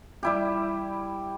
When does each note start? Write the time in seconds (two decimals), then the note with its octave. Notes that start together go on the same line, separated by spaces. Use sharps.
0.23 G3 E4 G4